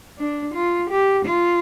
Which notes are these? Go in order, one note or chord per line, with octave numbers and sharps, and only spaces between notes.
D4
F4
G4
F4